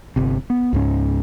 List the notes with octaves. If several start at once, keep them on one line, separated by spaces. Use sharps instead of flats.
G1 C3
B3
C#2 G#2 C#4